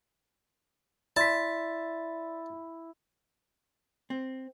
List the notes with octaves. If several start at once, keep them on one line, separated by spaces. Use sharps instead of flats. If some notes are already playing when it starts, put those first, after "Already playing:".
E4 D5 A5 C6 B6
C4